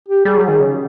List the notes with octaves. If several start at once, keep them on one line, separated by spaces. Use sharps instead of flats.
G4
G3 G#4
F#3
D#3 G#4
C#3